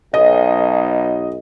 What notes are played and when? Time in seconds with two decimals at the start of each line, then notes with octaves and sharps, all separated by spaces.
0.14 B1 D#5